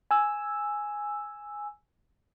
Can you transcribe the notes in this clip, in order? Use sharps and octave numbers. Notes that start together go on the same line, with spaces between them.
G#5 E6